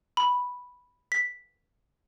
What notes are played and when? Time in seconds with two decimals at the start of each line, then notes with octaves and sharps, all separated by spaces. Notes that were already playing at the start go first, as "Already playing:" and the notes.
0.17 B5
1.12 B6